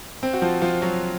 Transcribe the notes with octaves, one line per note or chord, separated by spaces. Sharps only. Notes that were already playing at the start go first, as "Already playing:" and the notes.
C4
F#4
F3 F4
F3 F4
F#3 F#4